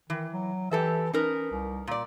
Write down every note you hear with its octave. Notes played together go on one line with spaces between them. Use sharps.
D#3 E3
F#3
E3 G4 A4 E5
C#4 D#4 A#4 B4
C2
A#2 D5